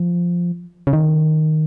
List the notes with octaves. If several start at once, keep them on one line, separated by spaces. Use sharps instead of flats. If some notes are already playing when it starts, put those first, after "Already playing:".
Already playing: F3
C#3
D#3